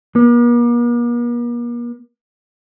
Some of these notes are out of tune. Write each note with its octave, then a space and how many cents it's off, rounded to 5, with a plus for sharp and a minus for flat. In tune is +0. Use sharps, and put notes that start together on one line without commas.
A#3 +45